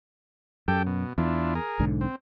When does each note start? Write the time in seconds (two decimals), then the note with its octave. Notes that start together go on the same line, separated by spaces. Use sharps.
0.68 F#2 G4 A4 G5
0.86 B2
1.18 E2 D4 E4 F4
1.55 G#4 A#4
1.79 B1 G#2 D3
2.01 C4